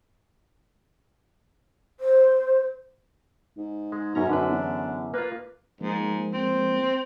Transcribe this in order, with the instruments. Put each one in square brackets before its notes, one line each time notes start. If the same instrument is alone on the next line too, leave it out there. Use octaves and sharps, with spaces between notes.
[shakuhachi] C5
[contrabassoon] G#2
[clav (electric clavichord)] G#3
[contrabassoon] B1 [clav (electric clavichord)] F#2 C#4 A#5
[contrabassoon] B1 [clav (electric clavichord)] F#2 D3 B4 [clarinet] D4
[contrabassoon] E2
[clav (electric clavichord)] A#3 F4 [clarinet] B4
[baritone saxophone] G#2 [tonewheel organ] F3 G#3 A#3
[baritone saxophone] C4